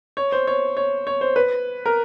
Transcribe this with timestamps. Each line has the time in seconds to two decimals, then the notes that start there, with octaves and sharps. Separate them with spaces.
0.17 C#5
0.32 C5
0.47 C#5
0.77 C#5
1.07 C#5
1.21 C5
1.36 B4
1.86 A#4